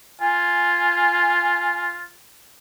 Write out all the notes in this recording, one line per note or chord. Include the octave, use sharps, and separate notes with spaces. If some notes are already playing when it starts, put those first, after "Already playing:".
F4 G#5